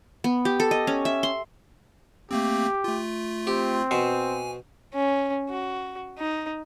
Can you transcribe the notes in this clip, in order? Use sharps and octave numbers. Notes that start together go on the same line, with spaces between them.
B3
G4
A4
D#5
C#4
E5
C6
A3 A#3 C4 G4
A3 F4
C4 G4
B2 C5 G#5
C#4
F#4
D#4